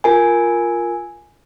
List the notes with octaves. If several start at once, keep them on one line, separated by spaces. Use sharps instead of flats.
F4 A#4 G#5